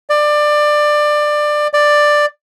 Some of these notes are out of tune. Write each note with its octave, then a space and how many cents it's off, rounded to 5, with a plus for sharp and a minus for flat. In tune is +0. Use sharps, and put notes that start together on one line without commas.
D5 +20
D5 +10